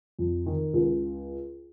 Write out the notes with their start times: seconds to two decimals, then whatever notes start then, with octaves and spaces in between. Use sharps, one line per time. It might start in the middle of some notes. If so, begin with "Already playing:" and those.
0.19 F2
0.46 D#3
0.73 C#2